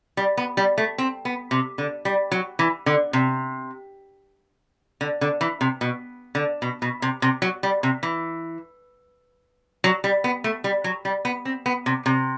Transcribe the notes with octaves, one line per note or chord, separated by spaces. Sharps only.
G3
B3
G3
A3
C4
B3
C3
D3
G3
F#3
E3
D3
C3
D3
D3
E3
C3
B2
D3
B2
B2
C3
C3
F#3
G3
C3
E3
F#3
G3
B3
A3
G3
F#3
G3
B3
C4
B3
C3
C3